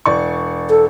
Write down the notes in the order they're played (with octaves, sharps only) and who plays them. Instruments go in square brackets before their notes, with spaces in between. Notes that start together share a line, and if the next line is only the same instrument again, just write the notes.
[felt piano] E1 D5 C#6
[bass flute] A4